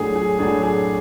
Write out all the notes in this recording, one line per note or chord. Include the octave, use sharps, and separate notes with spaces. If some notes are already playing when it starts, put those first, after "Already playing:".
Already playing: A2 F#3 A3 D4 G#4
G#4
A2 F#3 A3 D4 G#4
G#4